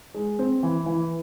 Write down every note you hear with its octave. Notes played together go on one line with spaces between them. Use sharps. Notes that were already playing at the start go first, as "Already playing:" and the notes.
G#3
C4
E3
E3